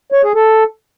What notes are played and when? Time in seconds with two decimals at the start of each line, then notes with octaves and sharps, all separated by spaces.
0.12 C#5
0.23 G#4
0.35 A4